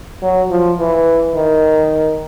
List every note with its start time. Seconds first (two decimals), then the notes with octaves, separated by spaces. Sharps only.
0.22 F#3
0.50 F3
0.79 E3
1.35 D#3